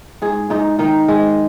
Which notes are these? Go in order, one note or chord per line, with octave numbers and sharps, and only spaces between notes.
G#2 G#4
G#2 D#4
D#3 D#4
G#3